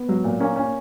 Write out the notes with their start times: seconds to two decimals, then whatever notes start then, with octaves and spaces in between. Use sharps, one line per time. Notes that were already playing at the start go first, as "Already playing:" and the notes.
Already playing: B3
0.09 F#3
0.24 A#2
0.40 A#3 C#4
0.56 C#4